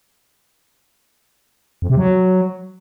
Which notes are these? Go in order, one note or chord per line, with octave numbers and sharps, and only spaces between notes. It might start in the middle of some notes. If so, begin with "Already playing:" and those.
F2
C3
F#3